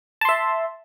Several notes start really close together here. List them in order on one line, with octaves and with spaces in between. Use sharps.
A5 C6 E5